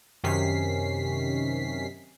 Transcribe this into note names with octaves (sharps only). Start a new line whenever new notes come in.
F#2 C3 D#3 C#4 B6 C7